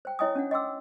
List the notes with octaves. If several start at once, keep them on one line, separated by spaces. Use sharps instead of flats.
C5 G5
E4 C#5 D#5 G5 G#5 D#6
C#4 D4 F#5
D#5 F#5 G5 C6 D6 E6